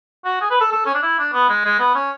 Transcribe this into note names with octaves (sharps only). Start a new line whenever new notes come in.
F#4
G#4
B4
A4
A4
C#4
D4
E4
D4
B3
G#3
G#3
B3
C#4